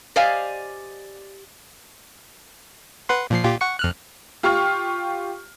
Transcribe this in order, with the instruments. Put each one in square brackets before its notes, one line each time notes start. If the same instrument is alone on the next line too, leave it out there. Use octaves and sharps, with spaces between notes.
[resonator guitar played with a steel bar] G4 C5 D5 D#5 F5 G#5
[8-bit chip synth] B4 F#5 C6
A#2 F3 C7
A#2 F4 G4
F#5 C#6 C#7
F2 F6 F#6
[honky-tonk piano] F4 G4 F5 C#6 F6